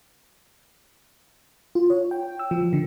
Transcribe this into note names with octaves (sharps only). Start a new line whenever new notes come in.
F4
C#5
G5
E6
F3
D3